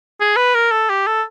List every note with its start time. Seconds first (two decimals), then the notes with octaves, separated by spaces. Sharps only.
0.20 G#4
0.37 B4
0.55 A#4
0.72 A4
0.89 G4
1.07 A4